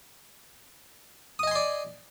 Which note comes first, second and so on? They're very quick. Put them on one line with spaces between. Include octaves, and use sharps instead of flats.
D#6 D#5 G#5 C6 D5